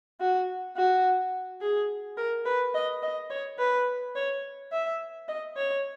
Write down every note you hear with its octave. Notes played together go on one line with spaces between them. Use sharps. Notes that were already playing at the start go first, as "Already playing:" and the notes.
F#4
F#4
G#4
A#4
B4
D#5
D#5
C#5
B4
C#5
E5
D#5
C#5